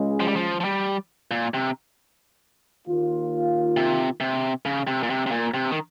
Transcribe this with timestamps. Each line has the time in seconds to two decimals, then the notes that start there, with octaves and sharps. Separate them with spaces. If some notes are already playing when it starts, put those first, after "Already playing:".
Already playing: C#2 C#3 G#3
0.20 F3
0.28 G3
0.36 F3
0.60 F3
0.64 G3
1.31 A#2
1.54 C3
2.87 D#2 D#3 A#3 F4
3.77 C3
4.20 C3
4.65 C#3
4.87 C3
5.03 A#2
5.10 C3
5.26 C3
5.31 A#2
5.54 C3
5.71 D#3